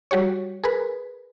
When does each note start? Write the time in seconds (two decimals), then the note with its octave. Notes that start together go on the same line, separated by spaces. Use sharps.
0.11 G3 F#4 G4 C#5
0.64 G#4 A#4 B4